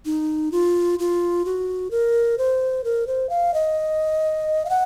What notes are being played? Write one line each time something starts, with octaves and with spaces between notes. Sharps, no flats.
D#4
F4
F4
F#4
A#4
C5
A#4
C5
F5
D#5
F5
F#5